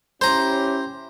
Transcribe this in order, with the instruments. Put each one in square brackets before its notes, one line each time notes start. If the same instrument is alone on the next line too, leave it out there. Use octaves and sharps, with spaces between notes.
[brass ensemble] C#4 E4 G4 [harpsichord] C5 A#5